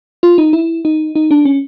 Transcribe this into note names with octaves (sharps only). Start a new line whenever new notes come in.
F4
D#4
E4
D#4
D#4
D4
C#4